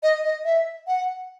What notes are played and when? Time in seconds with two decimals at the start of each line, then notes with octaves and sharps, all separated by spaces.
0.03 D#5
0.24 D#5
0.45 E5
0.87 F#5